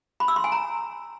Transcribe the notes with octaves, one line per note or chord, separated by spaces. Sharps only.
B5
E6
C6
G#5
A#5